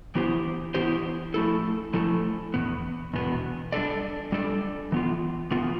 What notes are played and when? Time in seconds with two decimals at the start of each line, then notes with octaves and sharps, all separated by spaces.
0.15 E3 B3 E4 G4 C5
0.75 E3 B3 E4 G4 C5
1.34 F3 A3 E4 A4
1.94 F3 A3 E4 A4
2.54 E2 B2 B3
3.14 E2 B2 B3
3.72 G3 D4 A4 D5
4.32 G3 D4 A4 D5
4.92 E3 B3 F4
5.51 E3 B3 F4